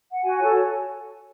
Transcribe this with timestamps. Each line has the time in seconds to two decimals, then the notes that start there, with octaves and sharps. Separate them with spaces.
0.11 F#5
0.22 F#4 G#5
0.40 A4 C#5